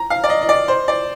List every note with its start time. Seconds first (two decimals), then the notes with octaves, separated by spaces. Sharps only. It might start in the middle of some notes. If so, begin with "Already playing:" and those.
Already playing: A#5
0.10 F5
0.24 D5
0.30 D#5
0.41 D#5
0.49 D5
0.68 C5
0.88 D5